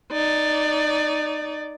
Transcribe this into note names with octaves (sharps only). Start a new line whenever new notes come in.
D#4 D5